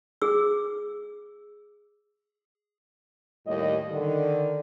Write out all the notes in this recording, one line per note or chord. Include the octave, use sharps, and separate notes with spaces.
G#4 E6
D#2 A2 G3 D#5
D3 D#3 A4